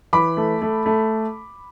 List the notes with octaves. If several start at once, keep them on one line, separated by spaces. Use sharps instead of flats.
E3 B5 D6
A3
A3
A3